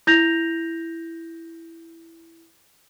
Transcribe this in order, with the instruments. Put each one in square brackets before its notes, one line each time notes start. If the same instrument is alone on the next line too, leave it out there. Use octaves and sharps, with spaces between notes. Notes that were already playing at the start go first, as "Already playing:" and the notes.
[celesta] E4 G6 A#6 F7